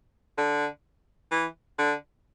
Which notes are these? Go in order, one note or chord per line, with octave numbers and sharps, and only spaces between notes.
D3
E3
D3